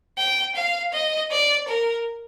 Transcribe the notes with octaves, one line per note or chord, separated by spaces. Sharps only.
G5
F5
D#5
D5
A#4